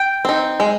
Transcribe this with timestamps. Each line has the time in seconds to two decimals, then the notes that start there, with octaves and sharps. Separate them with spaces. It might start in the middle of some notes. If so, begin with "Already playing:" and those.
Already playing: G5
0.25 C4 D#4
0.60 G#3